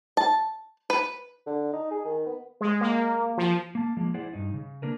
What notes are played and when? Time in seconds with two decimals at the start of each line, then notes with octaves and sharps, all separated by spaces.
0.17 A5
0.90 B4
1.46 D3
1.73 D#4
1.91 G#4
2.05 D#3
2.26 B3
2.61 G#3
2.81 A#3
3.38 F3
3.75 A#3 A5
3.97 F3 G#3 A#3
4.14 E4 G#4 C5 D5 F#5
4.33 G2 D#4
4.54 C#3
4.82 A#3 D4 A#4 B4